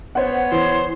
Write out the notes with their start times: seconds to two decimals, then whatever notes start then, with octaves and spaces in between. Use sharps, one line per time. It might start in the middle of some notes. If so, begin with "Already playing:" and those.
0.15 B3 C5 C#5 F#5
0.52 E3 C5